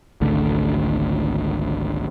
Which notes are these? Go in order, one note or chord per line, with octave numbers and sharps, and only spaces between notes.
G#1 C#2 D3 A3